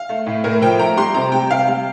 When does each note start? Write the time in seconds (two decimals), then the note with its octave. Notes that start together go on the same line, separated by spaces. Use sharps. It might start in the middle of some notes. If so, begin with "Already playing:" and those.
Already playing: F5
0.09 A3
0.26 A2
0.44 A2 A#4
0.61 F3 G5
0.79 A3 A#5
0.97 G3 C6
1.14 C3 A#5
1.32 G3 G5
1.51 C3 F5
1.67 G3